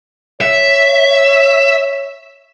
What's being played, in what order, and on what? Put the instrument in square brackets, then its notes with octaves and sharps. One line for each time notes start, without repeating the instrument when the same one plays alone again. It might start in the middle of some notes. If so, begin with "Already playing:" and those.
[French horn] C#5 [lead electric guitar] E5